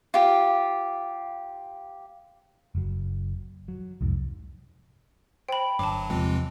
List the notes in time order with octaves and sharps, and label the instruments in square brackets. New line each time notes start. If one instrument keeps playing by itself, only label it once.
[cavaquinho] F4 G4
[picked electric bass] F#1 F#3
F#3
C2 F2 G#2
[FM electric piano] C5 [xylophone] G5 B5
[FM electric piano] G1 [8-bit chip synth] G2 F#3 [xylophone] A5 D6
[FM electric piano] E2 C3 F3 [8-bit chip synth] E3 G#3 C4